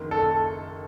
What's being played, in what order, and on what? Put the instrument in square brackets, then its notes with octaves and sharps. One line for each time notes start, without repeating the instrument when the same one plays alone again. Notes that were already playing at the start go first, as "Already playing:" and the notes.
Already playing: [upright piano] F#1 F#2 D#3 A#3
[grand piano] A4